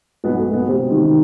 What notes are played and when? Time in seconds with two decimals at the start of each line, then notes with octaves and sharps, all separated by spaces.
0.24 B1 B3
0.39 A3
0.47 B2
0.53 B3
0.68 C3 C4
0.91 D#3